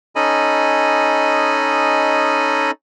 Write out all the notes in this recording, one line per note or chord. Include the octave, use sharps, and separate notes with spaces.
C#4 D#4 A4 D#5 G#5 B5